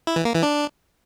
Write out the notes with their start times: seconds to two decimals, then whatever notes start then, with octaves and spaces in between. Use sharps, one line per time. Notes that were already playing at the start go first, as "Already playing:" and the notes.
0.07 E4
0.16 E3
0.25 A#3
0.34 E3
0.43 D4